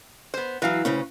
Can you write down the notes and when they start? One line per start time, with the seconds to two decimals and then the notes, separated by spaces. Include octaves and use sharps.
0.34 B3 C5
0.62 E3 F#3 B4 F5
0.85 D2 C#3 C#4